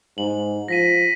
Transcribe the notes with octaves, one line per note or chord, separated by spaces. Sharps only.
G#2 F#7
F3 A#6 B6 D#7